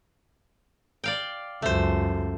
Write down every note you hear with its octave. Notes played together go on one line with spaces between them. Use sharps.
D5 F5 G5
C#2 F#2 A3 C5